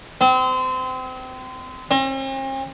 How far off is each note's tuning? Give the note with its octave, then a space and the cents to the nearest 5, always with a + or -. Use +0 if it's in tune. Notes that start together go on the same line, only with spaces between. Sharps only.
C4 -30
C4 +45